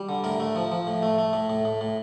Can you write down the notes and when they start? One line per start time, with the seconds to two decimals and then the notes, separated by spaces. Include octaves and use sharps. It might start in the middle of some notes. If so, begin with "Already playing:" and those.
Already playing: G3
0.09 D3
0.24 A2 A#4
0.40 A3
0.56 F3
0.72 F3
0.87 A2
1.03 A3
1.18 A3
1.33 A2
1.50 A2
1.65 A2
1.81 A2